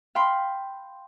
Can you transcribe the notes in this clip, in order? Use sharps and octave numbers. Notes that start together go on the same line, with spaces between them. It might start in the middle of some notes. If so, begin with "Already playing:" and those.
F5 G5 B5 C6